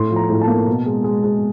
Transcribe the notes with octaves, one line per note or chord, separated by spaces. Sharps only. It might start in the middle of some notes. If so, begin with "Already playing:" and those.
Already playing: A2 C6
F3
A#5
A2
A5
A#3
B2
G#3
G#3
G#3